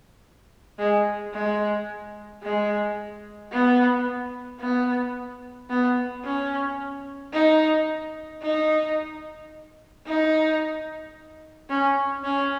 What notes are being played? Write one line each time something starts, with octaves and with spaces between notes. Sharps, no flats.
G#3
G#3
G#3
B3
B3
B3
C#4
D#4
D#4
D#4
C#4
C#4